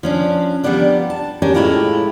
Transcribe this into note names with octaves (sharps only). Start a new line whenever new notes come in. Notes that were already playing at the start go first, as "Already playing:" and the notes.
F3 C#4 D4
F3 G3 A#3 B3 D4 D5
A5
C#4 D4 G4 A#4
A2 G#3 A3 E4 F4 G4